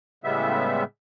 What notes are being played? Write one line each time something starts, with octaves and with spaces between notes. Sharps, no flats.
A2 C#3 G3 G#3 B3 E5